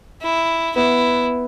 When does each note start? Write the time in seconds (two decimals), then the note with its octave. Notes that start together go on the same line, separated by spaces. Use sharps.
0.22 E4
0.75 B3 E4